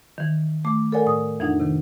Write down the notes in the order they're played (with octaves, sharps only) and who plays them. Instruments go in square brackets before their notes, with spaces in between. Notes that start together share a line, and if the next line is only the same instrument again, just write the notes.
[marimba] D#3 E3
A3 D6
A4 A#4 C#5 D5 F#5 G#5
A2 D#6
F2 E3 D4 D#4 F#5
C3 D#3